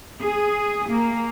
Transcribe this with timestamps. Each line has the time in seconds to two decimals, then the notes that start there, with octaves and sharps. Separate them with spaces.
0.21 G#4
0.89 A#3